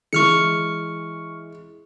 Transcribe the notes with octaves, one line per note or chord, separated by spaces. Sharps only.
E3 G#3 C#6 F6 C#7